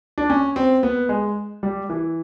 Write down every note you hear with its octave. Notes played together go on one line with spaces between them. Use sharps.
D4
C#4
C4
B3
G#3
G3
E3